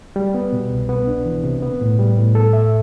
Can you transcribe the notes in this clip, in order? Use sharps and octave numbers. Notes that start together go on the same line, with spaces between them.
G3
B3
B2
C2
B3
D4
E3
C3
B3
A2
G3
A2
A4
E5